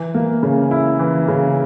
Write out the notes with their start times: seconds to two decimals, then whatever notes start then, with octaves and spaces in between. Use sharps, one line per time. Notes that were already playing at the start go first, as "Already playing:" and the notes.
Already playing: E3
0.15 A#3
0.43 C#3
0.71 E4
0.99 E3
1.28 C#3